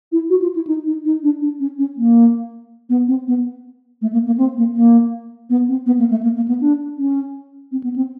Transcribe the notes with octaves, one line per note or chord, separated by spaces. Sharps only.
E4
F#4
F4
E4
D#4
D#4
D#4
D4
D4
C#4
C#4
A#3
B3
C4
B3
A3
A#3
A#3
C4
A#3
A#3
B3
C4
B3
A#3
A3
A#3
A#3
B3
D4
C#4
C4
B3
C4